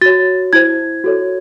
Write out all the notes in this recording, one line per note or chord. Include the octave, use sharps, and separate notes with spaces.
F#4 C#5 A6
E4 C5 G#6
F#4 A4 C#5